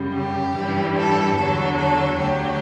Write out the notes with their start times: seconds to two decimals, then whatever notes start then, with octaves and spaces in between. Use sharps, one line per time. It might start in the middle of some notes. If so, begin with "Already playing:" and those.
Already playing: F#2 C#3 G3
0.13 G4
0.54 G2 E3 G3
0.96 A4
1.36 E2 D3 F#3 A4
1.79 A4
2.19 D2 D3 F#3 G4